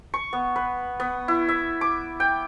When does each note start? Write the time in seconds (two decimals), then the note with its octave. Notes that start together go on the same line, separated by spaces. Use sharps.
0.14 C#6
0.33 B3
0.56 B4
1.00 B3
1.28 E4
1.49 E5
1.81 D6
2.20 G5